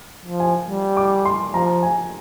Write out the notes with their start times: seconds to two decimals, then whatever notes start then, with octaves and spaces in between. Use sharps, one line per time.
0.25 F3
0.40 G#5
0.69 G3
0.97 D6
1.25 C6
1.54 F3 A#5
1.83 G#5